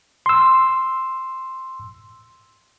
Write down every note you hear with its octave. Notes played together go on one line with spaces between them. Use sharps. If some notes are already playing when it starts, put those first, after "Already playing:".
C6 E6